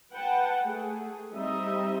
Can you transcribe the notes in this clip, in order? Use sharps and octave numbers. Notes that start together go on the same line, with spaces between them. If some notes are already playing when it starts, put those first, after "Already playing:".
B4 F#5 G5 A5
A3 G#4
G3 C4 D#4 D#5 E5